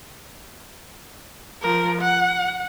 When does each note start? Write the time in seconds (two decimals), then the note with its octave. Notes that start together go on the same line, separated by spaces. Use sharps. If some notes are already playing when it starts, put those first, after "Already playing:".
1.62 F3 A#4
2.02 F#5